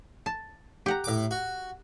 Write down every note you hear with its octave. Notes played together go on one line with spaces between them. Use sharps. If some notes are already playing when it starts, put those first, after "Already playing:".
A5
G4 F#5 A#5
A2 D6
F#4